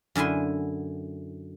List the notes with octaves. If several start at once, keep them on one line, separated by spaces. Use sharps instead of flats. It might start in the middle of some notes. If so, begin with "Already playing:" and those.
F#2 D3 E4 G#5 C6